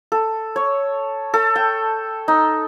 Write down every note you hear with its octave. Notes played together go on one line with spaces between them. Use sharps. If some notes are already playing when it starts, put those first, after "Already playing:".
A4
C#5
A4
G5
D#4